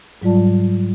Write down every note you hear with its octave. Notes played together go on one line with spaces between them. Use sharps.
G#2 F#3 G3 F4 D5 A5